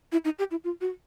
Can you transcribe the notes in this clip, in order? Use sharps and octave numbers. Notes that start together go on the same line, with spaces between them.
E4
D#4
G4
E4
F4
F#4